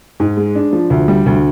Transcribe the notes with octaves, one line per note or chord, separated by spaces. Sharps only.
G#2
G#3
D4
F3
D2
G3
D2